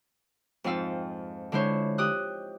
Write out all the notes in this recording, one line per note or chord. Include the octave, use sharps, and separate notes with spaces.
F2 G#2 C4 F5 E6
D3 G#3 E4 C5 C#5
G4 D#6 F#6